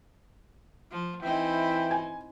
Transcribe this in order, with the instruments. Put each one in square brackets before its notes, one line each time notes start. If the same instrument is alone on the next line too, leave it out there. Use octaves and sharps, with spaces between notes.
[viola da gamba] F3
[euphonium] E3 [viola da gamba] C4 D#4 E4 [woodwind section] E5 G5
[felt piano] G#5